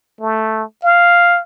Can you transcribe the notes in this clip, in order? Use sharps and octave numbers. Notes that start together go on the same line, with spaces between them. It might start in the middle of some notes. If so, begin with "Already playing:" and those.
A3
F5